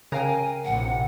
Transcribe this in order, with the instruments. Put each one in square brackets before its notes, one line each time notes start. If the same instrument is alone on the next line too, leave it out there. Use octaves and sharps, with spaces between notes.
[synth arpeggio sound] C#3 [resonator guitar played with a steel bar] A#4 F5 G5 [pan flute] G#5
[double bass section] A#1 A2 C3 [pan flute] F#5